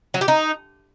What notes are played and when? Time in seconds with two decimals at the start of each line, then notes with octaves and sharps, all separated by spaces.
0.14 F#3
0.21 G4
0.28 D#4